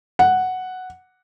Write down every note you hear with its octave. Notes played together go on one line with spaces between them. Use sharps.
F#5